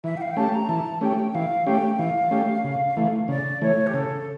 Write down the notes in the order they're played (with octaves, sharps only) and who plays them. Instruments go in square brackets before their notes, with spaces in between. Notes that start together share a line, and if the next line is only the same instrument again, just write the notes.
[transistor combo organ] E3 [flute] E5
[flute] G5
F5
G5
[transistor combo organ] A3 C#4 G4 [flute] A5
[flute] A#5
[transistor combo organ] E3 [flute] A5
[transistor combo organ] A3 C#4 G4 [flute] G5
[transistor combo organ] E3 [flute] F5
[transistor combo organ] A3 C#4 G4 [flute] G5
[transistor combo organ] E3 [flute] F5
[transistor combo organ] A3 C#4 G4
C#3
E3 A3
[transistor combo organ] C#3 [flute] D5
[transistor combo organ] E3 A3 [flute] C#5
[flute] G4
[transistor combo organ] C#3 [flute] A4